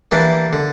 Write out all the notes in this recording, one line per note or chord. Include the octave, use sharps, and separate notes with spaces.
E3 G3 A#3 D4
D3